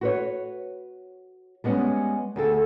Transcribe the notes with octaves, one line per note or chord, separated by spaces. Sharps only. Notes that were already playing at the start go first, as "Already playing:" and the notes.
F#4 B4 C#5
G3 G#3 B3 C#4
D2 G#4 A4 G5